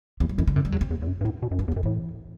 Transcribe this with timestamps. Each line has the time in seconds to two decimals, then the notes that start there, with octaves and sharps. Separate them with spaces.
0.20 E2 E3
0.29 F#3
0.38 F#2 E3
0.47 D3
0.56 F#2 C3
0.65 G3
0.72 E2 F#3
0.81 C4
0.90 E2
1.02 E2
1.07 F#2
1.21 G2
1.25 A2 C4
1.42 B2
1.51 F#2
1.59 G2 D4
1.68 E2
1.72 C4
1.76 F#2
1.83 A2 E3